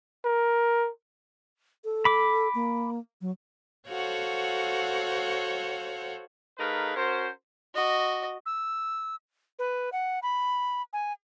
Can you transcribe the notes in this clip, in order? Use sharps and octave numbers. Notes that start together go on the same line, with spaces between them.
A#4
A4
B5 D6
A#3
F#3
F#4 A4 C5 C#5 F5 F#5
A3 D#4 G#4 A#4 B4 F5
C#4 F#4 A#4 C5
F#4 D#5
E6
B4
F#5
B5
G#5